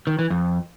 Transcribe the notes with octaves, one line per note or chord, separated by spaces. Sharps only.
D#3
E3
F2